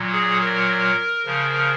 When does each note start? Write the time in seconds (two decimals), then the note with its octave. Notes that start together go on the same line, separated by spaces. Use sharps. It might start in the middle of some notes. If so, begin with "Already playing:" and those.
Already playing: A#2 F#3
0.12 G#4
0.40 A#4
1.25 C#3 F3